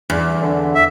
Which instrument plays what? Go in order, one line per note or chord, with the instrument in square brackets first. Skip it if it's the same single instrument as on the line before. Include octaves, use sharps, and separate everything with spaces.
[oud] E2
[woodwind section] D3
[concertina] E5